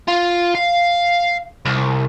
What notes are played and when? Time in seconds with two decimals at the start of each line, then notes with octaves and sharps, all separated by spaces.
0.08 F4
0.55 F5
1.66 C2